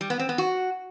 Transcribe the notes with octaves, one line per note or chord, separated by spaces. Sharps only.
G3
B3
C4
B3
F#4